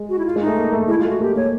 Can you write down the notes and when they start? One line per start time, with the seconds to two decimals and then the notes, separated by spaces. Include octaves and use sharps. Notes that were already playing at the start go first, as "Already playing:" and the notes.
Already playing: G#3
0.09 F#4
0.19 E4
0.26 F4
0.36 G#3
0.41 D#4
0.46 A3
0.56 A#3
0.73 A3
0.88 G#3 E4
0.99 F4
1.05 A3 F#4
1.20 A#3 G4
1.36 A#3 C#5